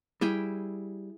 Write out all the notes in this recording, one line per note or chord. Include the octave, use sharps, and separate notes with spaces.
G3 E4 G#4 G5